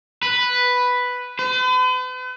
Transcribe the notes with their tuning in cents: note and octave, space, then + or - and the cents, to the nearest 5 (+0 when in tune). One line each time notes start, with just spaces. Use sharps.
B4 +0
B4 +45